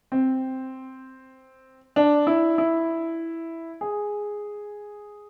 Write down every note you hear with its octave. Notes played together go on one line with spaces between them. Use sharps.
C4
D4
E4
E4
G#4